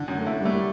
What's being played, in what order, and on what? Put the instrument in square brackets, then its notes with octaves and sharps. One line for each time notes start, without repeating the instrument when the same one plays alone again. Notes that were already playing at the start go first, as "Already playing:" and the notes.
Already playing: [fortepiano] D3
F#2
[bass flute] A3
[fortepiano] E4
[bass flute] G3
[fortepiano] A3